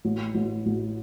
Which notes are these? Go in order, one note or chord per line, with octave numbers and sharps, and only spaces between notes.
A1
A1
A1